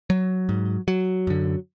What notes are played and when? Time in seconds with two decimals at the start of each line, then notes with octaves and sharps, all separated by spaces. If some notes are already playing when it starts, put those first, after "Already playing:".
0.10 F#3
0.49 G#2
0.88 F#3
1.27 F#2 D3